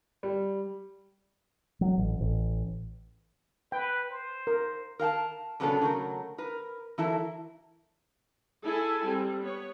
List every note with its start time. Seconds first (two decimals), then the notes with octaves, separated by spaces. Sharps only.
0.23 G3
1.81 F#3
1.98 A1
2.21 A1
3.72 B4 G5
4.10 C5
4.47 A#4
4.99 A#4 F5 G5 A5
5.60 A#2 C#3 F#3 B3 D4 A4
5.81 C#3 F#3 A3 A#4
6.38 A#4 B4
6.98 E3 F#3 E4 A4 A#4 E5
8.65 E4 G#4 A4 G#5 A5
9.04 G3 C4
9.42 B3 C#5